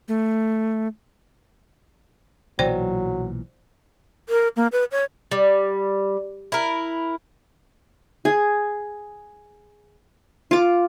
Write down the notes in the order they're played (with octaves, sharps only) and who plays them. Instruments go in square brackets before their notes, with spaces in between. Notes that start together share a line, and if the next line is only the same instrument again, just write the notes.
[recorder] A3
[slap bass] B1 A#2 E3 [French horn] F#3 [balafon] C5 D5 G5
[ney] A#4
A#3
B4
C#5
[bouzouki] G3
E4 A#4
[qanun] G#4
F4 D6